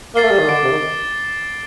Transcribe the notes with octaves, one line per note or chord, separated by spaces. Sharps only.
A#3 A6 C7 G7
A3
G3
D#3
D3 D6 A6 D7
C3
D#3